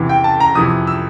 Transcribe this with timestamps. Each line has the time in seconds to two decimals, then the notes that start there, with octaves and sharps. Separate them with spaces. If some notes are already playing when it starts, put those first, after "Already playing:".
Already playing: E2 C3 E3
0.09 G5
0.24 A5
0.40 A#5
0.55 F2 C3 E3 D#6
0.87 E6